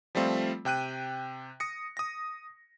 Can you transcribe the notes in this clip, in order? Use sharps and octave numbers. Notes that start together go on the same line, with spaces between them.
F3 G3 A3 C4 F4
C3 G5 F#6 D#7
D#6 A#6 C#7
D#6 A#6